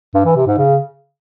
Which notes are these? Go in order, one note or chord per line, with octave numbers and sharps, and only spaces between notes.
G2
E3
C3
G#2
C#3